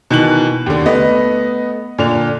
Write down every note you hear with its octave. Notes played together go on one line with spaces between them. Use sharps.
B2 D#3 E3 F#6 F#7
D#2 D3
A3 B3 D#5
A#2 D3 F7